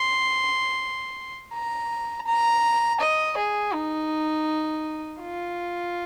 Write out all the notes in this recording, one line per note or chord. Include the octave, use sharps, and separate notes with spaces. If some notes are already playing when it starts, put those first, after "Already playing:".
Already playing: C6
A#5
A#5
D#5
G#4
D#4
F4